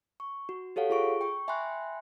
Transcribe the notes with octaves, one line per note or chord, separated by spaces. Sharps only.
C#6
F#4
G4 A4 C#5 F5 F#5
F4 G#4 C#6 D7
G5 C#6
E5 G5 G#5 B5 C6 F#6